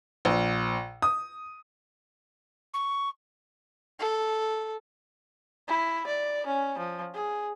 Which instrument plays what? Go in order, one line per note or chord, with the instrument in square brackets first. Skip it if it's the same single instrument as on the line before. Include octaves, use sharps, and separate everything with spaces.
[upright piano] A#1
D#6
[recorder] C#6
[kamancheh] A4
[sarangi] E4
D5
C#4
F3
G#4